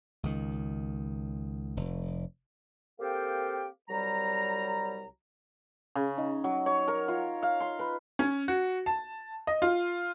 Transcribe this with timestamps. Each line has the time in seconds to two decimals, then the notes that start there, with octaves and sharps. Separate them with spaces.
0.23 C#2 D#3
1.77 F1
3.00 A#3 C4 G4 A4 F5 G5
3.89 C2 F#3 G3 A#5
5.95 C#3
6.18 D#4
6.44 F#3
6.66 C#5
6.88 A#4
7.08 F4
7.43 F5
7.60 C6
7.79 B4
8.19 C#4
8.48 F#4
8.86 A5
9.47 D#5
9.62 F4